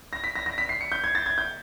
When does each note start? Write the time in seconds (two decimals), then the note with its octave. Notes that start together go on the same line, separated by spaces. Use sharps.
0.13 A#6
0.24 B6
0.36 A#6
0.46 A#6
0.58 B6
0.69 C7
0.81 C#7
0.92 G6
1.04 G#6
1.15 A6
1.26 G#6
1.38 G6